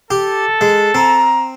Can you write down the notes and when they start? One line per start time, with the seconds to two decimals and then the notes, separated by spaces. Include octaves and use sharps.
0.11 G4 A4
0.61 G#3
0.95 C4 A#5